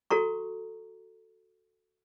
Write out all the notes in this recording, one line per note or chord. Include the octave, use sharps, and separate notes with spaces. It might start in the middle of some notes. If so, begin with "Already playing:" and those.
F#4 A4 A#5 C#6